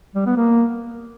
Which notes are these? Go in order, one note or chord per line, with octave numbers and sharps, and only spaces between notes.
G3
B3
A#3